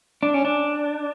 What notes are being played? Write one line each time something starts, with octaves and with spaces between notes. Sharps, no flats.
D4
C#4
D4